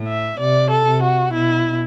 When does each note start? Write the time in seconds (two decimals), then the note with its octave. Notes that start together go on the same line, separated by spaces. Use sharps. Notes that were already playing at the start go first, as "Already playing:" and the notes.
Already playing: A2
0.08 E5
0.39 C3 D5
0.70 A4
0.86 C3
1.03 F#4
1.33 B2 E4